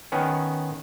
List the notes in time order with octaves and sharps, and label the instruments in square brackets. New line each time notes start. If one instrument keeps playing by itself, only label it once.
[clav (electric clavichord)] D#3 B3 C#4